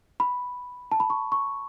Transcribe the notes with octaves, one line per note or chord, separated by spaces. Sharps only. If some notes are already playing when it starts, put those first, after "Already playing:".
B5
A5
B5
C#6
C#6